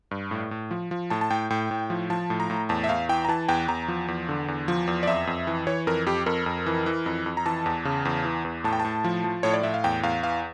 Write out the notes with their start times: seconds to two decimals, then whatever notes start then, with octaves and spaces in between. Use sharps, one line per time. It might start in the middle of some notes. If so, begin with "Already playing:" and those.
0.11 G2
0.31 A2
0.51 A2
0.71 F3
0.91 F3
1.10 A2 A5
1.21 A5
1.30 A2 G5
1.50 A2 G5
1.71 A2
1.90 F3
2.10 F3 A5
2.30 A2
2.40 A#5
2.50 A2
2.69 E2 A5
2.84 E5
2.89 E2 F5
3.09 E3 G5
3.25 A#5
3.29 E3 A5
3.48 E2 G5
3.68 E2 A#5
3.88 F3
4.08 E2
4.29 D3
4.48 E2
4.68 F3
4.87 E2
5.03 D5
5.07 F2 E5
5.27 F2
5.47 E3
5.67 E3 C#5
5.87 F2 A#4
6.06 F2 G4
6.26 F2 A#4
6.46 F2
6.66 E3
6.86 E3
7.06 F2
7.26 F2
7.37 A#5
7.46 E3 A5
7.66 E2
7.85 C#3
8.05 E2
8.25 E3
8.45 E2
8.64 A2 A5
8.73 G5
8.80 A2 A5
9.04 F3
9.24 F3
9.43 A2 C#5
9.53 D5
9.63 A2 E5
9.74 F5
9.84 E2 G5
10.03 E2 F5
10.23 E3 F5